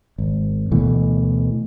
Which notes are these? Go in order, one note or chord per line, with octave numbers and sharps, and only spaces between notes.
G#1
D2 B2 E3 A3